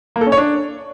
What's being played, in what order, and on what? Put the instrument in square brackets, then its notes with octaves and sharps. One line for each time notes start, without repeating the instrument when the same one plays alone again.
[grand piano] A#3
A4
C#4
C#5
D4